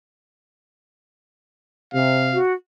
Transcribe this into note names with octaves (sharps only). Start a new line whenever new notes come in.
C3 F5
F#4